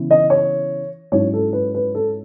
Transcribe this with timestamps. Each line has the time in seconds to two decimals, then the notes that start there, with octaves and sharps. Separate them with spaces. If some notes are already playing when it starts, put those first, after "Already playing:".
Already playing: C#3 E3 B3
0.11 D#5
0.30 C#5
1.12 G#2 F#3 C#4 E4 C#5
1.33 A4
1.53 B4
1.74 B4
1.95 A4